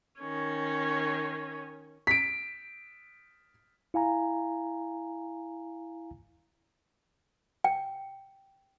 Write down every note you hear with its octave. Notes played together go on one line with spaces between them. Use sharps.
D#3 C#4
B6 D7
E4 F5 G#5 A#5
G5